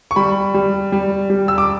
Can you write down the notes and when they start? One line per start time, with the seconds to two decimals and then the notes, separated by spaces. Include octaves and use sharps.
0.11 C#6
0.16 G3 B5
0.54 G3
0.92 G3
1.30 G3
1.48 E6
1.58 D6